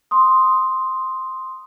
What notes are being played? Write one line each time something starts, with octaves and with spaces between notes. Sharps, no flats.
C6 D#6